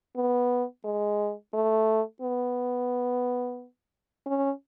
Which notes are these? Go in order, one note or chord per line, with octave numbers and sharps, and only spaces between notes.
B3
G#3
A3
B3
C#4